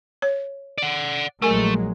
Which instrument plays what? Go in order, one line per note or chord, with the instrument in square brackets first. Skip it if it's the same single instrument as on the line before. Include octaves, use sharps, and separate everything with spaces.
[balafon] C#5
[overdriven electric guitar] D5 F#5
[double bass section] A#1 F#3 G#3 [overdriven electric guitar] A3 [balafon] A#4 G#5